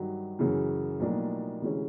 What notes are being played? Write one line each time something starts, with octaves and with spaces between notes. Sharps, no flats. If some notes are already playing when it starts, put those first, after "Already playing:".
Already playing: G2 D#3 F#3
F#2 C#3 E3
B1 A2 F3 A#3 D4
D2 C3 E3 G#3 C#4